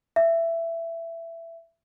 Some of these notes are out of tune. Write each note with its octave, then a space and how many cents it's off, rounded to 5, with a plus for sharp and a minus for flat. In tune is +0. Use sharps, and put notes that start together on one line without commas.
E5 +15